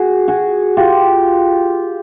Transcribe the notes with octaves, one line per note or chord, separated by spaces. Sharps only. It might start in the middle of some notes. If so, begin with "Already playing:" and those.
Already playing: F#4 G#4
F#4 G#4
F4 G4